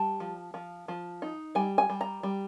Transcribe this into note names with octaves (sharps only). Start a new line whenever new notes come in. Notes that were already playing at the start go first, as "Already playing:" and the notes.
Already playing: G3 A5
F3
F3
F3
D#4
G3 G#5
G#5
G3
A#5
G3